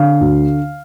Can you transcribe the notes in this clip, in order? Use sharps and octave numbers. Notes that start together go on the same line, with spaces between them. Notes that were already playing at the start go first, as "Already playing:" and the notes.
Already playing: D3 F5
D2